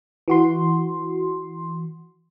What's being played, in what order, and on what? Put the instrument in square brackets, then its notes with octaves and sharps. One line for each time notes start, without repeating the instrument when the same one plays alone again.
[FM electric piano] E3 F#4 C6